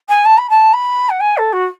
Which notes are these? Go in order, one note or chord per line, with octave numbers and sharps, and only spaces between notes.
G#5
A5
B5
A5
B5
F#5
G#5
A4
F#4